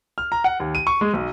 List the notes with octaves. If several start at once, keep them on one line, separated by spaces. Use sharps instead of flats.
F6
A#5
F#5
D#2
D#7
C#6
G#3
B1